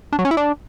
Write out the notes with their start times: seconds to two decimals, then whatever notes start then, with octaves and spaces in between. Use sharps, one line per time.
0.13 D4
0.19 F#3
0.25 C#4
0.31 E4
0.37 D4